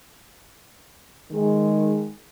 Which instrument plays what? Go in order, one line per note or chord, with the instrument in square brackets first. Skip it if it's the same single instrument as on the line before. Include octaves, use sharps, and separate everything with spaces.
[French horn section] D#3 G#3